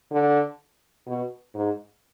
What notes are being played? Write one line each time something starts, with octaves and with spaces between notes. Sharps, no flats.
D3
B2
G#2